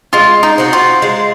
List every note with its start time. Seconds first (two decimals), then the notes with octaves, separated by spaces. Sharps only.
0.13 G#3 F4
0.43 D#4
0.58 C4 F#4
0.73 F4
1.02 G#3